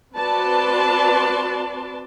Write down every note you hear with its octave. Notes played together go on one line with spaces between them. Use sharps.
C4 F#4 B4 D5 A5 C6